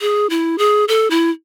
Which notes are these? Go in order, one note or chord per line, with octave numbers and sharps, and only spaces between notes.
G#4
E4
G#4
A4
E4